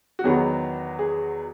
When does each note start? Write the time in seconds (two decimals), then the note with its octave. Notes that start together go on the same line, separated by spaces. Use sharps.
0.19 F#4
0.24 E2 D#3 F#3 B3 G#4
0.99 G#4